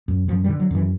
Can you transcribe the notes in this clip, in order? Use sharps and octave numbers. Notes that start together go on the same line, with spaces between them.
F#2
F#2 F3
G3
D3
F#3
F#2 E3